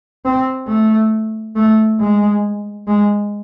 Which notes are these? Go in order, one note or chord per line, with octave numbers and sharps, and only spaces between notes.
C4
A3
A3
G#3
G#3